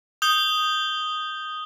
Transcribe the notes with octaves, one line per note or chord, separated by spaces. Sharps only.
D#6 G6 G7